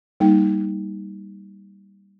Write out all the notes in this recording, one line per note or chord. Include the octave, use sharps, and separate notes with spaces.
G3 A#3 D#4 G5